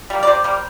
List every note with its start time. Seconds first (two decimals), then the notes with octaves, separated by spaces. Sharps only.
0.10 G3 A#3
0.23 D5
0.27 C3 C5
0.44 G3 A#3